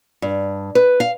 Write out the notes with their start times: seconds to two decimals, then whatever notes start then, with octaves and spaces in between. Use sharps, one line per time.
0.22 G2
0.75 B4
1.00 F5